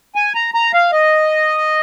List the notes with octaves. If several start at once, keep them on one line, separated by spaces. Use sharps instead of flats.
G#5
A#5
A#5
F5
D#5